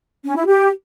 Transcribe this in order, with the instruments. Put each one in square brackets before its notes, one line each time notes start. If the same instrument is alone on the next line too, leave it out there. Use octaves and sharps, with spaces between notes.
[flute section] C#4
E4
G4